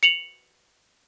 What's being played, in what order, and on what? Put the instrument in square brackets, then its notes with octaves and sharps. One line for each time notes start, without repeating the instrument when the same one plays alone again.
[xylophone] C#7 F7 F#7